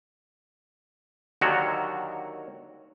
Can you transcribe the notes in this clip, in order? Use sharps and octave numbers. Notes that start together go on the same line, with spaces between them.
D#2 D3 D#3 F#3 F#4 C#5